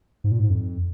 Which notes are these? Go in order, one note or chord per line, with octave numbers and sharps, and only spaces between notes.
G#2
A#2
G#2
F2